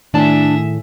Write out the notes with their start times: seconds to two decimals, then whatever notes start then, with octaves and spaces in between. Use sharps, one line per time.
0.14 A2 D#3 D4 G#4 D5 E5 A5